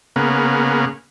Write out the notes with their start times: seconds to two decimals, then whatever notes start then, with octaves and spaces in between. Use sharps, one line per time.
0.16 C#3 A#3 B3